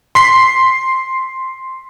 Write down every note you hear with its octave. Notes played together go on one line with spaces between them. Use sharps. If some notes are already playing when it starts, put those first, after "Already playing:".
C6 B6 C7